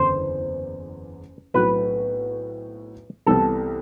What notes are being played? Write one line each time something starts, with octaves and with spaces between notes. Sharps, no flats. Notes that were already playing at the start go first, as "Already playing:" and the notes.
Already playing: F#1 E2 D3 C5
B1 A2 F#3 C4 F#4 B4
C2 C3 E3 G3 B3 A4